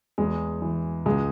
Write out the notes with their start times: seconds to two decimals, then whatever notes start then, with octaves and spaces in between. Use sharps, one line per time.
0.18 E2 G#3
0.62 E3
1.06 C#2 G#3